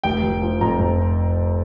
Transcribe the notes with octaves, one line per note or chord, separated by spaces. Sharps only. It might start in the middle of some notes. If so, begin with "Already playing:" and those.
F1 G5
F1
F3
F2 A#5
F2